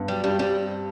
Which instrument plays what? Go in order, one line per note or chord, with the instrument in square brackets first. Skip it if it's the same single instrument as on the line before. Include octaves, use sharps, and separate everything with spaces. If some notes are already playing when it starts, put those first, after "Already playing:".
Already playing: [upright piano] G2 B3
[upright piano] F#3 [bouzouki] G3
[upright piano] G2 [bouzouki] G3
[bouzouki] G3 [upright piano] C4